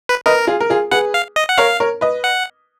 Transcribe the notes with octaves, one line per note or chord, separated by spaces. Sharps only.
B4
A#4 B4 D#5
F4 G#4
A#4
F4 G#4
G#4 B4 F#5
F5
D#5
F#5
A#4 C#5 F5
A#4 C#5
B4 D#5
F#5